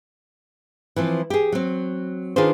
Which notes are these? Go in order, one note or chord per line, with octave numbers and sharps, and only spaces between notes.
E3 F3 C4
G4 G#4
F#3 C4
D#3 D4 F4 G#4 B4 C5